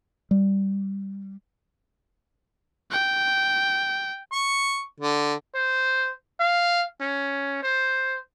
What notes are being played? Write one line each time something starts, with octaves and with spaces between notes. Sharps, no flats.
G3
G5
C#6
D3
C5
F5
C#4
C5